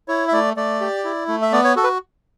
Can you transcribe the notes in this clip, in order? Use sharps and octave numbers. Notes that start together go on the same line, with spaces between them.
E4 C#5
E5
A3 D5
A3 D5
G4
E4
A3
E5
B3 D5
C#5
F#4 A4
B4